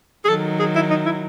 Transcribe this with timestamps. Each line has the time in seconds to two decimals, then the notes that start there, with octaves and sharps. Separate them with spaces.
0.25 G#4
0.28 D#3 F#3 A4
0.59 G#4
0.75 E4
0.90 D#4
1.06 E4